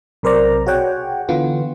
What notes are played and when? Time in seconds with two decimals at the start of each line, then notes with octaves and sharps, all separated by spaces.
0.23 B1 C3 A#4 C5 D5 A#5
0.66 F#4 G#4 C#5 F#5 G5
1.29 D3 E3 B3 F4